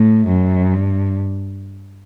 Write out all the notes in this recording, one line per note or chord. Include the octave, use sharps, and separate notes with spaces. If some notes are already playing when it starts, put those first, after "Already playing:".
Already playing: A2
F#2
G2